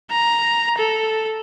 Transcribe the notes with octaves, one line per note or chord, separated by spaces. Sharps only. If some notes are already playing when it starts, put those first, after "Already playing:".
A#5
A4